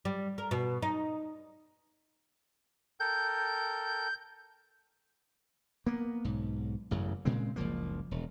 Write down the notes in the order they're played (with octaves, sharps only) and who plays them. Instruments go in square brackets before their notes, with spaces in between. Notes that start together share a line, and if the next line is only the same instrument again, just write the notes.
[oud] G3
A#4
B2
D#4
[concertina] A4 A#4 G5 [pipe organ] G6
[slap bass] A#3 B3
B1 G#2
A1 F#2 C#3
A#2 C#3 G#3 C4
F#1 C#2 F3 A#3
E1